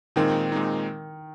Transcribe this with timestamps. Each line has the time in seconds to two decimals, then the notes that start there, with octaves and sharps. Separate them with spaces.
0.16 A#2 D#3 G#3 C4 D#4
0.52 A#2 G#3 C4 D#4